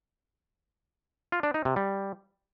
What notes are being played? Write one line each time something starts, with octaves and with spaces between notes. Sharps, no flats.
F4
D4
D#4
C3
G3